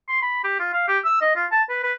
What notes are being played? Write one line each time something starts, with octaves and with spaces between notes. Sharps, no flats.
C6
B5
G4
F4
F5
G4
E6
D#5
F4
A5
B4
B4